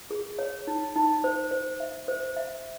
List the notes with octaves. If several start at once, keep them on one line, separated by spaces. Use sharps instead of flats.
G#4
C#5
D#4
D#4
C5
C5
E5
C5
E5